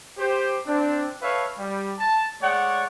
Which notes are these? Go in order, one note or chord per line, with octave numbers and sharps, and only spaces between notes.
G4 C5
C4 D4
A4 B4 C#5 E5 F5
G3
A5
G#3 A3 C#5 D5 F#5